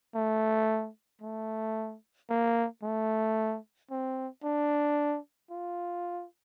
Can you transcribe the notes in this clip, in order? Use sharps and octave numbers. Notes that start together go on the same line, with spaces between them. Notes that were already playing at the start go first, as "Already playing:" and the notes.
A3
A3
A#3
A3
C4
D4
F4